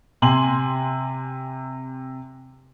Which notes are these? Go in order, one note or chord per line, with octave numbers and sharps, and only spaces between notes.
C3 G#5 C6 F#7